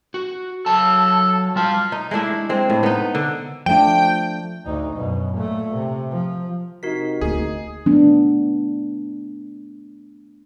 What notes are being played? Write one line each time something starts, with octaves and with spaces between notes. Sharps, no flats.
F#4
F#3 A4 A5
G3 F4 A5
D#4
G#3 A3 D4 E4
G#3 C4
A2
B3 D#4
D3
F3 A3 D4 G5
D2 D#4
F#2 B2
A#2 A3
C3
F3
C3 D#4 F#4 A#4 B6
D2 A#3 G#4
A3 B3 D4